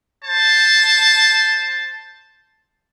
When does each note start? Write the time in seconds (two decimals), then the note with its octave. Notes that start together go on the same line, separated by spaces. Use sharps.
0.23 C5 A5